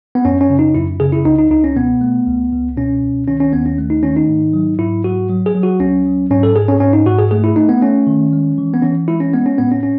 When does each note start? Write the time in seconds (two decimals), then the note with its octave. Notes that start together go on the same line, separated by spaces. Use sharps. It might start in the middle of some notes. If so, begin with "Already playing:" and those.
0.15 B3
0.25 F#2 C#4
0.41 C#4
0.50 C#3
0.59 D#4
0.75 F#2 E4
1.00 C#3 G#4
1.12 E4
1.25 C#2 D#4
1.38 D#4
1.51 C#2 D#4
1.64 C#4
1.76 B2 B3
2.01 A3
2.26 C#2
2.52 C#2
2.77 B2 C#4
3.03 C#2
3.27 D#3 C#4
3.40 C#4
3.53 D#2 B3
3.66 C#4
3.78 A3
3.90 D#4
4.03 D#3 C#4
4.16 D#4
4.28 G#2
4.53 F#3
4.78 G#2 E4
5.04 F#3 F#4
5.30 F#3
5.46 G#4
5.55 F#3
5.63 F#4
5.80 C#2 C#4
6.06 F#3
6.30 G#2 C#4
6.43 A4
6.56 G#2 G#4
6.68 C#4
6.80 G#2 C#4
6.93 D#4
7.06 G#2 F#4
7.18 G#4
7.31 A3 G#4
7.44 E4
7.56 A3 D#4
7.69 B3
7.81 A3 C#4
8.07 D#3
8.33 G#3
8.58 E3
8.74 B3
8.82 E3 C#4
9.08 G#3 E4
9.20 C#4
9.33 G#3 B3
9.46 C#4
9.58 A2 B3
9.71 C#4
9.83 C#4